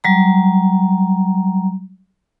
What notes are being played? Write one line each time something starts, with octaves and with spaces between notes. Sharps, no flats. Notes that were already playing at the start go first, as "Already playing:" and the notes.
F#3 G3 A#5